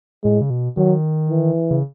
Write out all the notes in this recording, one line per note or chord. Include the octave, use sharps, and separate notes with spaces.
A2 G#3
C#3
B2
D#3 F#3
E3
C#3